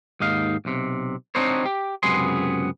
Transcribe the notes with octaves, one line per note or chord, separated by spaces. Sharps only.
D#2 G#2 D#4 F5
B1 C3
C4 D4 D#4 F#4 C5 C#5
G4
C#2 F#2 C3 B3 G#4 C6